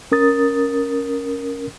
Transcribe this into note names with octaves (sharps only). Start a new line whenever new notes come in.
C#4 A#4 D#6 A6